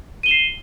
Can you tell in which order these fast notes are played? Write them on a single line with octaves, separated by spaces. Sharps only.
D#7 G7 E7 C7